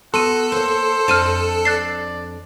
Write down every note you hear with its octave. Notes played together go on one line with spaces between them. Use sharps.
B3 F#4 A4 C6 D#7
A#3 C5 C#5
F2 D4 A5 F6 D#7 E7
D5 F#6 A6 C7